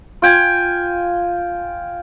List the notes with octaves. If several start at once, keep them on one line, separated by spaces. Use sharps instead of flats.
F4 G5 G#5